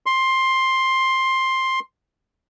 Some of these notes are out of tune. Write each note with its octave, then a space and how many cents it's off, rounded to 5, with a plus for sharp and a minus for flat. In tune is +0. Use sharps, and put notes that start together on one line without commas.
C6 +10